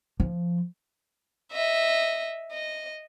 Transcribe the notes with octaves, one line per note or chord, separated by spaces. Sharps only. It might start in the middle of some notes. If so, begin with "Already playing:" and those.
F3
D#5 E5
D#5